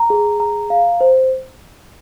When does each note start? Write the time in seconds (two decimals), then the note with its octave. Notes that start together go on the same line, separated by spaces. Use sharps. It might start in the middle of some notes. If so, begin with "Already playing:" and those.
Already playing: A#5
0.10 G#4
0.40 A#5
0.70 F5
1.01 C5